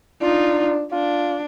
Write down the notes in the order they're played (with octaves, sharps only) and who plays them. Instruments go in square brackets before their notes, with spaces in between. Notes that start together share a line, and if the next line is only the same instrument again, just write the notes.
[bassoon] D4 [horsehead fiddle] D#4 F4
[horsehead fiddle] D4 [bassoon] F4